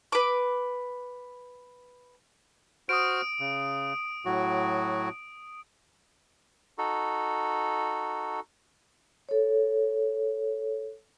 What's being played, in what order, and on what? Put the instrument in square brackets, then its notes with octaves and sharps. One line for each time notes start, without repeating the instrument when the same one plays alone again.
[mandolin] B4 D6
[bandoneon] F#4 C5 F6 [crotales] D#6 D7
[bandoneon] C#3
A2 F#3 F#4
[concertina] D#4 F#4 A4
[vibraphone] A4 C#5